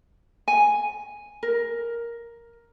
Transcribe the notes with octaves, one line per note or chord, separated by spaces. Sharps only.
G#5
A#4